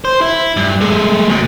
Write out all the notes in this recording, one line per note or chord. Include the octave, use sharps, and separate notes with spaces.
C5
E4
G2
G#3 A3
D2 B2